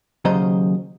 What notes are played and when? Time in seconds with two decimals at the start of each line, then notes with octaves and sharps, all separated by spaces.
0.25 D#2 C#3 F#3 C5 D#5 A#5